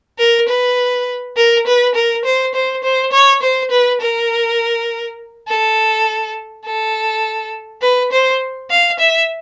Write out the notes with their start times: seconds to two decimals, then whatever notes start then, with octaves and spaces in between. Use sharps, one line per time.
0.19 A#4
0.48 B4
1.37 A#4
1.66 B4
1.95 A#4
2.25 C5
2.54 C5
2.84 C5
3.12 C#5
3.42 C5
3.71 B4
4.01 A#4
5.48 A4
6.65 A4
7.82 B4
8.12 C5
8.70 F5
8.99 E5